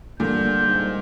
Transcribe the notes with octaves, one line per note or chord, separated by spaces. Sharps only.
A#2 D3 G3 G6
G#2